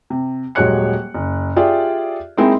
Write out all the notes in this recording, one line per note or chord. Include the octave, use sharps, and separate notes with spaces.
C3
D#1 F#3 G#3 C#5 F#6 C#7
F#1
F4 G4 G#4 D5 E5
G#3 A#3 C4 D#4 E4 G#4